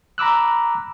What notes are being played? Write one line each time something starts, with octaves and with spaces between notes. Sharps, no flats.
A#5 B5 D6 E6 F#6